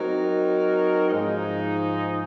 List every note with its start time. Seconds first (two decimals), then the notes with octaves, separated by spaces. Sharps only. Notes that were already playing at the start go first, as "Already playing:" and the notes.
Already playing: F#3 C4 D#4 A#4
1.09 G#2 F3 G#3 D#4